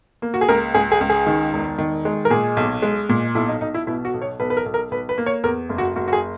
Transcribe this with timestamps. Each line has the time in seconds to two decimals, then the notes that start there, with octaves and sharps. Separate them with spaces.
0.22 A#3
0.34 F#4
0.41 G#4
0.48 C#2 A#4
0.74 C#2 G#4
0.92 G#4
1.01 C#2
1.10 G#4
1.27 D#3
1.53 E1
1.78 D#3
2.05 G#3
2.25 A#4
2.30 A#2 G#4
2.57 B1
2.82 G#3
3.09 A#2
3.35 B1 E4
3.48 D#4
3.61 B1 D#4
3.74 E4
3.87 B2 E4
4.05 F#4
4.14 B1
4.22 C#5
4.40 B1 B4
4.50 B4
4.57 A#4
4.66 B1
4.74 A#4
4.91 B1 B4
5.09 B4
5.18 A#3
5.26 C#5
5.44 E2 A#4
5.69 F#1
5.78 F#4
5.96 F#1 F#4
6.08 F#4
6.13 G#4